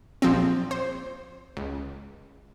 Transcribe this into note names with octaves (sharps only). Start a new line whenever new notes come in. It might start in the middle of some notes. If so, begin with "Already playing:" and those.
A#1 F3 C4
C5
C#2